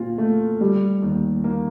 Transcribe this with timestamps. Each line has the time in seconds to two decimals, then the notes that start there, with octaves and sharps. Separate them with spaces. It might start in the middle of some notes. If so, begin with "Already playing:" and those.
Already playing: A#2 C4 F4
0.18 A3
0.61 G3
1.02 D#2
1.44 A#3